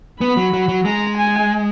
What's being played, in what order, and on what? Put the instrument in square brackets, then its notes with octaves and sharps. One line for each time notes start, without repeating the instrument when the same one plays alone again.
[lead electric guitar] B3 [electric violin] B5
[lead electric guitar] F#3
F#3
F#3
[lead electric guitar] G#3 [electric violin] A#5
[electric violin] G#5